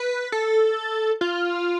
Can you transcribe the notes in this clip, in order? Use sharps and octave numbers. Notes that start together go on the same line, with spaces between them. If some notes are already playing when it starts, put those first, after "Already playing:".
Already playing: B4
A4
F4